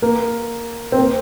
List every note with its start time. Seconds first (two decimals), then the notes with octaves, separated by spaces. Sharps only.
0.02 A#3
0.92 C4
0.98 A#3